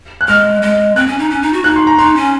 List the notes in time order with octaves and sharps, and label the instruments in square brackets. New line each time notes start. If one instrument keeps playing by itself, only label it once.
[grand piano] F#6
[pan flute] G#3 [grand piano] F6
[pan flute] G#3
[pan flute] C4 [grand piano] F#6
[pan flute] C#4
D#4
C#4
D#4
F#4
[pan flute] D#4 [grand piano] F#6
[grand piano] C6
A#5
[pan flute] D#4 [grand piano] C6
[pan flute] C#4